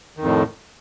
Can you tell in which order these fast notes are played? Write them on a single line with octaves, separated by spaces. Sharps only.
D#3 F2 A2